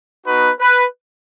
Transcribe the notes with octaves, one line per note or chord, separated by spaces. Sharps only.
B3 D#4 F#4 B4
B4